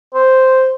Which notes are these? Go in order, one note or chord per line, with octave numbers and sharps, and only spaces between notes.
C5